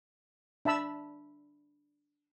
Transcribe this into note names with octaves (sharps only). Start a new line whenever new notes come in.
D4 E5 A5 B5 E6